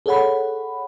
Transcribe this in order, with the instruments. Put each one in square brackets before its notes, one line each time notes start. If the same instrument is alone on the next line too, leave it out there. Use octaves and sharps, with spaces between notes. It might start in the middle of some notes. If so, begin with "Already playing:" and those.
[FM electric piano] G#4 A4 C#5 F#5 B5